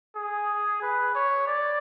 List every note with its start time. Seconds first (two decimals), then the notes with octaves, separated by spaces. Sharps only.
0.16 G#4
0.82 B4
1.15 C#5
1.48 D5